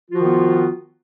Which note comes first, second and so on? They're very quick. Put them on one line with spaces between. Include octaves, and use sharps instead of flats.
F4 F3 F#4 D#3 B3